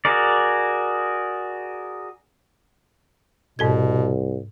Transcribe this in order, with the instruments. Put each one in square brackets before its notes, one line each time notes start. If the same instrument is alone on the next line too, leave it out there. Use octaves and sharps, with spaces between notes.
[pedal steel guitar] F#4 G#4 A#4 D5
[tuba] C2 [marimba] G#2 A4 G#6 [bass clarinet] B2